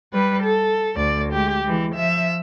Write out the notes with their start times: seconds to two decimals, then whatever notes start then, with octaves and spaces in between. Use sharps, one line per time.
0.14 G3 B4
0.44 A4
0.96 D2 D5
1.33 G#3 G4
1.64 E3 G#3
1.95 F3 E5